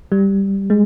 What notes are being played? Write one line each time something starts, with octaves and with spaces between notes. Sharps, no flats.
G3
G#3